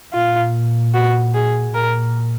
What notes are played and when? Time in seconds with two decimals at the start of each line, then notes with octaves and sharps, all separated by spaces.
0.13 A#2 F4
0.94 F#4
1.34 G#4
1.74 A#2 A#4